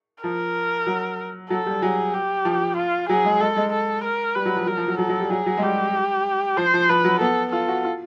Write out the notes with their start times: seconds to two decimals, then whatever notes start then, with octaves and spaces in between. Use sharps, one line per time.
0.23 F3 A#4
0.87 F#3
1.50 F#3 A4
1.66 G3
1.82 F#3 G#4
2.13 G4
2.45 F3
2.77 F4
3.09 F#3 G#4
3.25 G#3
3.40 G#3 A4
3.57 G#3
3.73 A4
4.04 A#4
4.35 G3 B4
4.45 F#3
4.56 F3
4.67 F#3 A#4
4.77 F3
4.88 F#3
4.99 F#3 A4
5.09 F#3
5.20 G3
5.31 F#3 G#4
5.46 F#3
5.57 G#3
5.62 G3 G4
6.57 F3 C5
6.74 F3
6.89 F3 B4
7.04 F#3
7.20 B3 A4
7.52 F4 A4
7.68 F#4
7.85 F4